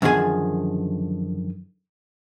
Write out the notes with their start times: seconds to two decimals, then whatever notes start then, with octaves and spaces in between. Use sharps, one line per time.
0.02 F#2 D3 D#3 F3 G#4 G#5